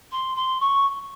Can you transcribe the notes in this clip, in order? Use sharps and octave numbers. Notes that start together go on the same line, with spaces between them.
C6
C6
C#6